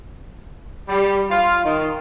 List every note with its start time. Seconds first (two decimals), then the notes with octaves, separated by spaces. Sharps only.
0.89 G3
1.30 F4
1.65 D#3